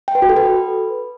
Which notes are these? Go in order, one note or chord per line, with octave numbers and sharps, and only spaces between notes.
G5
B4
F#4
A4
B4